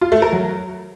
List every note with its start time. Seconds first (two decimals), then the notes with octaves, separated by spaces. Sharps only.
0.01 F4
0.12 A3
0.22 A#4
0.33 F#3